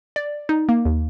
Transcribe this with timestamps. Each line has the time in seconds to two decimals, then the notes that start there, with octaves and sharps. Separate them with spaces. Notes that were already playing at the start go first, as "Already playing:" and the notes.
0.16 D5
0.49 D#4
0.69 A#3
0.85 D#2